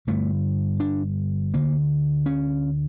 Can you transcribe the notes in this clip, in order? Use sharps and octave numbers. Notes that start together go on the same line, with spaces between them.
G1 G2 D3 A3
D4
D2 D3 A#3
C#4